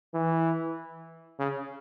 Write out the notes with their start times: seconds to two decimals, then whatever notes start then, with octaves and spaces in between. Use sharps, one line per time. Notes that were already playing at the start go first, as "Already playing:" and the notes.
0.14 E3
1.39 C#3